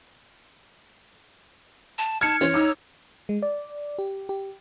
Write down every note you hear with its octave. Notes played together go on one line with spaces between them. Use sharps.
A5
D#4 A5 F6 G#6 C#7
E3 C#4 C5 C#5
D#4 D6 E6
G#3
D5
G4
G4